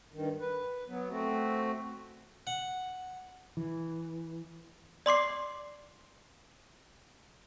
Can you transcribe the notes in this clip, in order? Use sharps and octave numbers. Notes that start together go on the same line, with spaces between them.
G2 D#3
B4
F#3 B3
A3 C4 F#4
F#5
E3
D5 C6 D6 C7